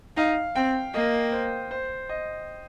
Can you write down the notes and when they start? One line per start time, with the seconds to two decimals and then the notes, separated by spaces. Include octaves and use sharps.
0.17 D#4 F5
0.55 C4 G5
0.94 A#3 D#5
1.32 C5
1.71 C5
2.09 D#5